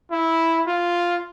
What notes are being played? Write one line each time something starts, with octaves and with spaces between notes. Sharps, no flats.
E4
F4